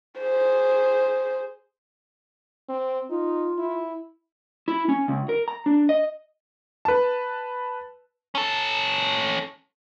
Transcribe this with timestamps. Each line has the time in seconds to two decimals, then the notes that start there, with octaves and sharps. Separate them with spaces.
0.20 G#4 C5
2.69 C4
3.10 D#4 F4
3.58 E4
4.68 E4
4.89 C#4
5.08 C#2
5.29 A#4
5.48 A#5
5.66 D4
5.89 D#5
6.85 B4 A5
8.35 C#4 A4